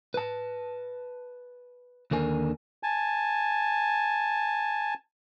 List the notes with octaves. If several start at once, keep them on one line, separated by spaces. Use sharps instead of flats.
B4 A5
D#2 D3 A#4 G#5
G#5 A5